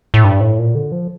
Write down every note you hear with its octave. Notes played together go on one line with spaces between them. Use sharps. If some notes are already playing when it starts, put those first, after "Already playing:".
A2
G2
A2
A#2
D3
F3